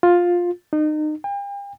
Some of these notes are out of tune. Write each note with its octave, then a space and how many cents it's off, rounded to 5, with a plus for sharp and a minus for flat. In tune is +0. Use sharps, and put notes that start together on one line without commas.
F4 +10
D#4 -30
G5 +40